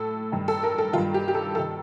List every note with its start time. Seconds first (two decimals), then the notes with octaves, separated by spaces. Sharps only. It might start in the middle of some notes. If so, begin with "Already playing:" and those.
Already playing: A2 A4
0.32 G2 D#3
0.48 A4
0.63 A#4
0.78 A4
0.93 D#3 F4
0.98 G2
1.14 G4
1.28 G4
1.35 A4
1.55 G2 D#3 A4